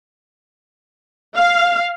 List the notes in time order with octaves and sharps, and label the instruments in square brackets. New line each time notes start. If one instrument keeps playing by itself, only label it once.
[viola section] F5